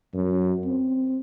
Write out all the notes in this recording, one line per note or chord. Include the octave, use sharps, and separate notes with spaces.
F#2
C4